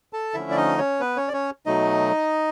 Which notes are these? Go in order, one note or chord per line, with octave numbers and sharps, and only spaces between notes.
A4 A5
D3 F3 A3 C#4 E4 E5
D5
D#4 D#5
C#4 C#5
B3 B4
C#4 C#5
D5
C#4 C#5
B2 F#3 A3 D#4 D#5